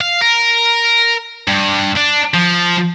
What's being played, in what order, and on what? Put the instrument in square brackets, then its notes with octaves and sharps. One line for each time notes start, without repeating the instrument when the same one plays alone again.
[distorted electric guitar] F5
A#4
G2
D4
F3